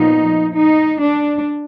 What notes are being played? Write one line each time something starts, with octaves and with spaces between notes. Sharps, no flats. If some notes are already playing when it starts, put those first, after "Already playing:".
Already playing: A#2 F3 B3 D#4
D#4
D4